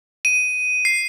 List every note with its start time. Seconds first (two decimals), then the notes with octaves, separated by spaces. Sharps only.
0.25 D#7
0.85 C7